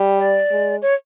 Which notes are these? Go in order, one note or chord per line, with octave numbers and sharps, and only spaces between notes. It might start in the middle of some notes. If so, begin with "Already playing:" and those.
Already playing: G3
D5
G#3
C#5